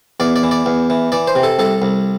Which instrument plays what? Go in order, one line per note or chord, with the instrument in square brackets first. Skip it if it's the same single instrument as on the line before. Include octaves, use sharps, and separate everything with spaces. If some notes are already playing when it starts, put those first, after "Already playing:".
[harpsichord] E2 D5
D5
E3
D5
E2
E3
E3 D5
C5
C3
A4
C2 A4
C2